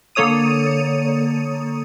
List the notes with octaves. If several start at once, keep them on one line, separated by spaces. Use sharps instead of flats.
D3 A#3 A4 C#5 D#6 D#7